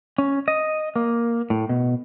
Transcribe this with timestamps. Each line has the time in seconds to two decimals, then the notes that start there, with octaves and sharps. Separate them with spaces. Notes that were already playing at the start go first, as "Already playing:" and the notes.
0.18 C#4
0.48 D#5
0.96 A#3
1.50 A2
1.69 B2